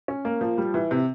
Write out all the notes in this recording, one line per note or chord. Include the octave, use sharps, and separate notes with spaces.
C#4
A#3
F3
G3
E3
C3